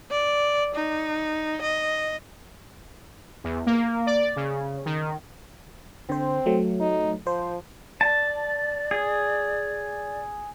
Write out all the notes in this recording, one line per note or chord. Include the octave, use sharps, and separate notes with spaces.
D5
D#4
D#5
E2
A#3
D5
C#3
D#3
D3 C4 C5
F#3 A3
D#4
F3 C5
D5 A5
G#4